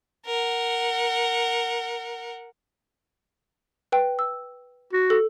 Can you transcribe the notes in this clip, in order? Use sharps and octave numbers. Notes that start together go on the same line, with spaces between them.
A#4 F#5
B4 G5
E6
F#4
A4